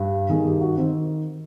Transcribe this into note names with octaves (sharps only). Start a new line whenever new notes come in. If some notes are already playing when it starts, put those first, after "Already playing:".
Already playing: G2
G2 D#3 G#4
G4
F#4
D#3 C4